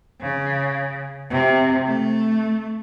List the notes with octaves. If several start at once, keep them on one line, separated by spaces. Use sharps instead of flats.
C#3
C3
A3